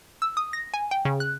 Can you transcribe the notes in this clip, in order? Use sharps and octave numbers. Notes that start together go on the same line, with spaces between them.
E6
D#6
A#6
G#5
G5
C#3
F#6